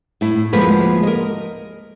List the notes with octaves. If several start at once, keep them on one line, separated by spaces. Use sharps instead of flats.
A2 E4
D2 F3 G#3 A#3 B3 B4
A#4 D#5